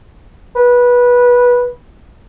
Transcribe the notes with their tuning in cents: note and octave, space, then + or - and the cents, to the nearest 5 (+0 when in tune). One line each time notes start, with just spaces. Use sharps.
B4 -15